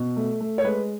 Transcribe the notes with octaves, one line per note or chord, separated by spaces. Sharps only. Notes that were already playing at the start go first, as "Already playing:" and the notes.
Already playing: B2
A3
A3
C#5
G#3 B4